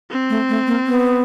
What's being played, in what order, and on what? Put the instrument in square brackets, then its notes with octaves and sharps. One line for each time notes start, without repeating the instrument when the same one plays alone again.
[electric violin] C4
[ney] A3
A3
A#3
B3